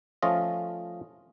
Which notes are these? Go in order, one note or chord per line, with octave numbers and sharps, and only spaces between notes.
F3 A3 C#4 F4 D#5